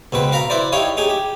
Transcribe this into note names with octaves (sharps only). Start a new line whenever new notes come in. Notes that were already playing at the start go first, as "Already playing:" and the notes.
C#2 B2 C4 B4
A#4 F5 A#5 B5
E4 B4 C5 D5
D#4 E4 G4 C#5 F5
D#4 G4 G#4
G4